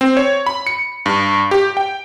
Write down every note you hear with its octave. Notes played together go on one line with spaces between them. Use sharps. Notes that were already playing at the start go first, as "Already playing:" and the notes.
C4
C#5
B5
C#7
G2
G4
G5